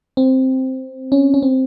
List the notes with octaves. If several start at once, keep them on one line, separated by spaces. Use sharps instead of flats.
C4
C#4
C#4
C4